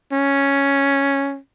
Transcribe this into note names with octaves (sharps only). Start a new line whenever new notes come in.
C#4